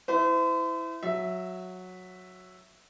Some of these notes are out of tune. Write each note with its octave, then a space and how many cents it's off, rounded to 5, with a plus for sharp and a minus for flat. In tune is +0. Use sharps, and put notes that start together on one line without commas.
E4 +0 C5 -40
F#3 -10 E5 +0